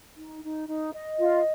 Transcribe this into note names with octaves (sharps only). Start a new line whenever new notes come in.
D#4
D#4
D#4
D#5
F4